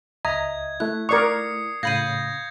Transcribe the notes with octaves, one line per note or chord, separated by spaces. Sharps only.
C#2 D#5 E5 A#5 D#6 G#6
A3 E4 F#6
A#4 D5 C#6 D#6 F#6 G#6 C7 C#7
A2 C#3 F5 B5 G6 G#6 A#6 D#7